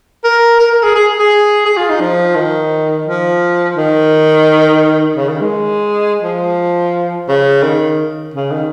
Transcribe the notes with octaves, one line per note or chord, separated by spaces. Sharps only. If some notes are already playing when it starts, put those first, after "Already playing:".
A#4
A#4
A#4
G#4
G#4
G#4
G#4
F4
D#4
F3
D#3
F3
D#3
C#3
D#3
G#3
F3
C#3
D#3
C#3
D#3